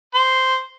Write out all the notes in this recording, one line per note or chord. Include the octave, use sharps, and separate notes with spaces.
C5